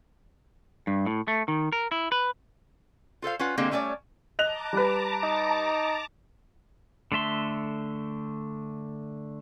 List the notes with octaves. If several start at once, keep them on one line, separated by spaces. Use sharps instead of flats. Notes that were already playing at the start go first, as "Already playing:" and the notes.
G2
A2
A3
D#3
A#4
E4
B4
F4 A4 C5 F5
C#4 F4 B4 F#5
D3 G3 G#3 A#3 C4
G3 A3 C#4 C#5 D5
D#5 A5 A#5 D6 F#6 F7
G3 B4
D#4
D3 A3 E5 C6